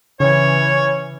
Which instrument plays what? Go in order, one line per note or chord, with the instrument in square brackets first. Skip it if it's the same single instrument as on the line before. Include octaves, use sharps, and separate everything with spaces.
[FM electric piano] C#3 [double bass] E3 [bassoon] C#4 [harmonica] C#5